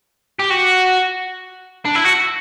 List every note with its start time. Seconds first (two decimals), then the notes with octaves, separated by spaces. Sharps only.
0.40 G4
0.50 F#4
1.85 D4
1.95 E4
2.04 F#4